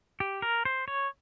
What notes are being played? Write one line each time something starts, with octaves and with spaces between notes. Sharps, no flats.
G4
A#4
C5
C#5